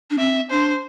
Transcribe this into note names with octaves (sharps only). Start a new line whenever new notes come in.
D4
C4 E5
D4 C5